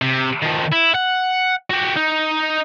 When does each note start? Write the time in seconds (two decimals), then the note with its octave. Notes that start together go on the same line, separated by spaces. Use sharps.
0.02 C3
0.42 D#3 F3
0.72 E4
0.94 F#5
1.70 F#4 G4
1.97 D#4